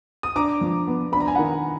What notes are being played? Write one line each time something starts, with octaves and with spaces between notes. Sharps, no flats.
D#6
D4 A#5 D6
F3
B3
D4 B5
A#5
G#5
D#3 F#5 A#5